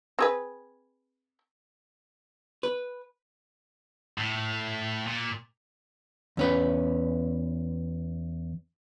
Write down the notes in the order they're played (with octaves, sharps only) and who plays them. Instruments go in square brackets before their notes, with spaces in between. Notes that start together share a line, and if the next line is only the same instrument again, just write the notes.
[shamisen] C4 G#4 B4
[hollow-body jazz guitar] B4
[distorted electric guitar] A2
A#2
[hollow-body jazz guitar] E2 C#4 B4